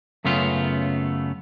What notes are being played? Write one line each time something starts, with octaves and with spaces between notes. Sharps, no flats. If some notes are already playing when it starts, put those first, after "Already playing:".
F#2 C#3 A3 B3 F4